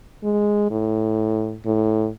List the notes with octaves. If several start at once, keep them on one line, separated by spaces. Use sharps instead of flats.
G#3
A2
A2